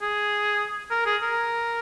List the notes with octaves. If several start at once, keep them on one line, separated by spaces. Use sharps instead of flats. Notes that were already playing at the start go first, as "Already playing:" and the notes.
G#4
A#4
G#4
A#4